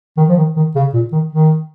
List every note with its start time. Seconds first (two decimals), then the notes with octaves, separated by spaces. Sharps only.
0.17 D#3
0.28 F3
0.37 D#3
0.56 D#3
0.75 C#3
0.94 A#2
1.12 D#3
1.32 D#3